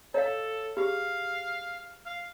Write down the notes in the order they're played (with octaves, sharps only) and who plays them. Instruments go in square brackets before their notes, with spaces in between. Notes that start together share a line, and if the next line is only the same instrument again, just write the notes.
[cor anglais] A4 [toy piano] C#5 D#5 F5
[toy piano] G4 G#4 [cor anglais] F5
[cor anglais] F5